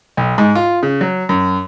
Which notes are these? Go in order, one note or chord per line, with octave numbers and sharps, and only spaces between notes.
B1
G#2
F4
C#3
F#3
F#2